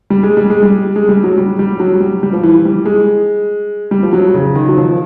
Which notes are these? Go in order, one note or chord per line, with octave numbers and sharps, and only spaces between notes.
G3
G#3
G3
G#3
G3
G#3
G3
F#3
G3
G3
F#3
G3
G3
F3
E3
G3
G#3
G3
F3
F#3
C#3
D#3
F#3
F3